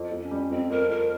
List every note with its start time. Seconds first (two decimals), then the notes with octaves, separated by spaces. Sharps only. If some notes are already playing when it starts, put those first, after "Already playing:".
Already playing: F2
0.12 F2
0.21 C#4
0.31 G3
0.51 F2 C4
0.70 F2 A#4
0.90 F2 A#4